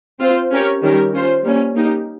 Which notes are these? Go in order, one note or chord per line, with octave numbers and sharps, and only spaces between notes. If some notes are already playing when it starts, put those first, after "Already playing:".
C4 F4 C5
C#4 G4 A#4 C#5
D#3 G3 C#4 G4 A#4
C#4 F4 C5
G3 A#3 C#4
A#3 D#4 G4